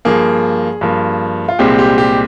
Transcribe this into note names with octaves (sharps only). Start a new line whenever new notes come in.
G2 F3 A#3 G#4
G2 F3 A#3
F4
C2 A#2 G#3 C4 G4
G4
G4